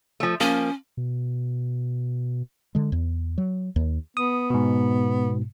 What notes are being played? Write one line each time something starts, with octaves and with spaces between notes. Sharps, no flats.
F3 A3
F3 A#3 C#4
B2
D3 G#3
E2
F#3
D#2
B3 D#6
G#2 B2